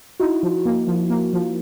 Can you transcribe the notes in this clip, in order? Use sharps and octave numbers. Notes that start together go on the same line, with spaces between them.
D#4 E4 F#4
F3
A#3
F3
A#3
F3